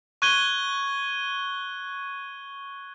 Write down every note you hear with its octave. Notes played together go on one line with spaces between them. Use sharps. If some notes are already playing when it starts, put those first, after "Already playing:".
C#6 F#6 G#6 D#7 G7